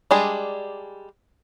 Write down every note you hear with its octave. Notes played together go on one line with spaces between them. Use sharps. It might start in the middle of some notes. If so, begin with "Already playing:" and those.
G3 G#3 D4 G#4